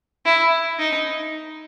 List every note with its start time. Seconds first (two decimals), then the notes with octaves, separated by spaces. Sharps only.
0.25 E4
0.79 D#4